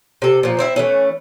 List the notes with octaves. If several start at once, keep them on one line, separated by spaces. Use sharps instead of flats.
C3 A4
A#2 F3
C4 E4 E5
E3 A3 C#4